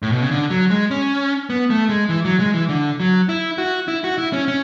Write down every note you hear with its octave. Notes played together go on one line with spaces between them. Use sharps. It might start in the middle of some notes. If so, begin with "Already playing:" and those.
A2
B2
C#3
D3
F#3
G#3
C#4
B3
A3
G#3
E3
F#3
G#3
E3
D3
F#3
E4
F#4
E4
F#4
E4
C#4
C#4